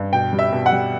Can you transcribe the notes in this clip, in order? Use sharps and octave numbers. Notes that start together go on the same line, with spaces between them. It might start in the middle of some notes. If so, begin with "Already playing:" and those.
Already playing: G2
B2 G5
G3
E5
B2
F#5
G3